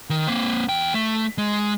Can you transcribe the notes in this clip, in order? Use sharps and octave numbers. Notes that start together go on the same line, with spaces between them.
D#3
A#3 C4
E2 G5
A3
G#3